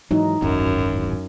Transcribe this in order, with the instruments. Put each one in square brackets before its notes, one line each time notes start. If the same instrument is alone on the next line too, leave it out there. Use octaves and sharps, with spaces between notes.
[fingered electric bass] G#2 E3 F#3 [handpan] D#4
[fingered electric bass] D1 G#1 F#3 [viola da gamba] F#2